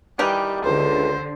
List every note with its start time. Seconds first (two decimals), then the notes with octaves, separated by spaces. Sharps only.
0.19 D#3 E3 G3 G4
0.65 C#2 D3 C5